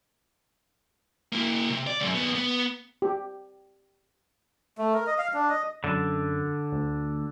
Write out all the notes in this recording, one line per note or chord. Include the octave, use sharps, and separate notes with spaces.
A#3 E4
C3
D5
C#2 F#2
D#2 B3
B3
G4
A3
A#4
D#5
F5
D4
D#5
F#2 D3
D2